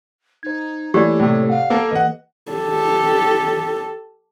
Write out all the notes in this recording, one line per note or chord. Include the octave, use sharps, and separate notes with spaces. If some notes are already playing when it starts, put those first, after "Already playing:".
D#4 C5 G#6
E3 A3 A#3 G4 A4 C#5 D5
A2 C3
F5 F#5
A#3 A4 A#4
E3 A#3 B4 D#5 F#5
G4 A4